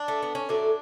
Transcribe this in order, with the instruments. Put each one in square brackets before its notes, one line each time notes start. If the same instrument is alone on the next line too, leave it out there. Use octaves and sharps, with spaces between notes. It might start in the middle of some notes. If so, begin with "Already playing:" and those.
Already playing: [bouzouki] D4
A3
B3
C#4
A2 F#3 A3 D4